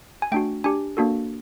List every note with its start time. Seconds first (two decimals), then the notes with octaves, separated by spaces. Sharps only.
0.22 G#5
0.32 A3 D4 F#4 G5
0.64 D4 G4 G#5
0.97 A#3 D4 F#4 A4